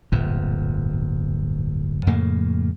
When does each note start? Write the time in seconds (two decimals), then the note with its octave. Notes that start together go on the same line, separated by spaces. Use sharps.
0.12 D1 G1 F2 A#2
2.07 F2 A2 C#3 A#3